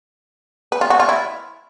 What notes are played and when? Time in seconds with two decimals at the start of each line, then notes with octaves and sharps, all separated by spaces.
0.72 B4
0.81 F4
0.90 F#4
1.00 F4
1.09 E4